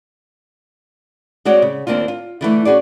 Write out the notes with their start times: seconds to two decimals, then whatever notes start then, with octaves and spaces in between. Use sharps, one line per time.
1.45 G#3 C4 F#4 C#5 D5
1.62 C#3
1.87 D#2 A#3 C4 D4 F4
2.08 F4
2.41 D3 E3 F#3 A3
2.65 C#4 F#4 G#4 D5